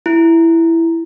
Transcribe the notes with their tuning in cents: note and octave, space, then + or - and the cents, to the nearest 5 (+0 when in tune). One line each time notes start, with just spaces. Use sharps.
E4 +5